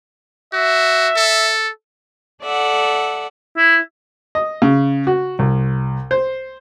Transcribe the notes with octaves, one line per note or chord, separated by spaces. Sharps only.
F#4 E5
A4
A4 D5 E5 F#5
E4
D#5
C#3
F#4
C2
C5